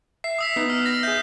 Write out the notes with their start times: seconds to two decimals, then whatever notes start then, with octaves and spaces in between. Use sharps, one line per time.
0.24 E5 C7
0.38 D#6 E6 B6
0.56 B3 D#4
0.70 F6
0.86 A#6
1.03 G#4 E5 G6